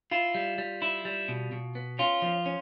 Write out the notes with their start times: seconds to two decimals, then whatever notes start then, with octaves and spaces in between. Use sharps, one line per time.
0.11 E4 F4
0.35 G3
0.58 G3
0.82 E4
1.05 G3
1.28 B2
1.52 B2
1.75 B3
1.99 C#4 F4
2.22 F3
2.46 C#4